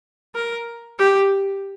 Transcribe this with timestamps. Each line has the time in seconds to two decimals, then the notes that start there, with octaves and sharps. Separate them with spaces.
0.35 A#4
0.99 G4